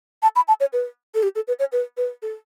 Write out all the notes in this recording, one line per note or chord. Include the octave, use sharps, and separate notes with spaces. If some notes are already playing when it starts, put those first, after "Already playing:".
A5
B5
A5
C#5
B4
A4
G4
A4
B4
C#5
B4
B4
A4